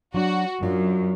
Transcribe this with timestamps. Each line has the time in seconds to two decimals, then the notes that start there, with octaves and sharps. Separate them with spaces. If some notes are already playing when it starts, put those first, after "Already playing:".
0.14 F#3 D4 F#4
0.63 F#2 F#3 D4 F4